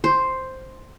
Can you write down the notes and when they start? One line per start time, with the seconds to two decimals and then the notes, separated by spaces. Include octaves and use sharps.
0.04 C5